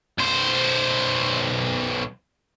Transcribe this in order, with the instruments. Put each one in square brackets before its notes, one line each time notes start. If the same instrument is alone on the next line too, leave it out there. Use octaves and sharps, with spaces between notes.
[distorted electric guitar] B1 C5